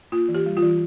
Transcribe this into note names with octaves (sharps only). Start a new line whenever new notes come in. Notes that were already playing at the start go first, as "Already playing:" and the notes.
A#3 F4
E3
G4
G3
F4
E3